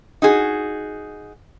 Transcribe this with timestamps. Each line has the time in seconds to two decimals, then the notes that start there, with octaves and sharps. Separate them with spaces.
0.22 D#4 F#4 G#4